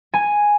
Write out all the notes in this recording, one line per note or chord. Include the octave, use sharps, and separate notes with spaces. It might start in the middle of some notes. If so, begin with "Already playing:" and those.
G#5